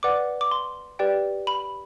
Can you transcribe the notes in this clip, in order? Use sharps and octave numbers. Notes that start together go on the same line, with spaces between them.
B4 D5 F#5 D6
D6
C6
G4 B4 D5 G5
B5